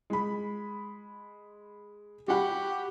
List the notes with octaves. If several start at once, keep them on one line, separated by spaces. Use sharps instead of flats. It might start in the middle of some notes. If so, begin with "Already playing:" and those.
G#3 B5
F#4 G4 F#5 B5